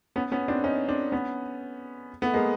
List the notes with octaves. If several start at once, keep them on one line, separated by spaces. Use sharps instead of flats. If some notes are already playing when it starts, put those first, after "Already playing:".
B3 C#4
B3 C#4
C4 D4
C#4 D#4
C4 D4
B3 C#4
A3 B3
G#3 A#3